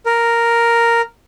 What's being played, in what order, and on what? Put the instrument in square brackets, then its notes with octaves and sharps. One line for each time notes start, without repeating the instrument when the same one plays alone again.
[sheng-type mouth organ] A#4